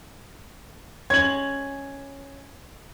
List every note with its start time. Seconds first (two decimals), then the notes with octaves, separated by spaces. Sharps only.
1.10 G#3 C#4 G#6 F#7